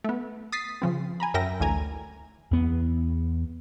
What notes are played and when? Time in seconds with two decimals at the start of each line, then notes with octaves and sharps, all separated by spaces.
0.04 A3 B3
0.52 D#6 A6 B6 C7
0.82 C#3 F3 C4
1.20 G#5 A#5 B5
1.34 F#2 A#4 E5 G5 A#6
1.60 A1 D2 G#5 A#5
2.51 E2 B3